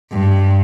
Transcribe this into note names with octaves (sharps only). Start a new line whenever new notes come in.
G2